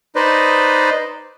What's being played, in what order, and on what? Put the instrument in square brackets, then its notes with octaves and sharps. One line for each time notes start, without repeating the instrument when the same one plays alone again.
[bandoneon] D#4 B4 C5 D5 D#5